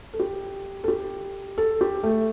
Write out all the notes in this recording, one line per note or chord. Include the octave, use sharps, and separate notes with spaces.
A4
G4
A4
G4
A4
G4
A3